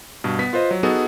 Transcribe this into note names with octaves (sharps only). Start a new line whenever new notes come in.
G2 B2
B3 B6
F4 B4 C5 D#5
F#3
B3 D#4 F#4 G#4 A4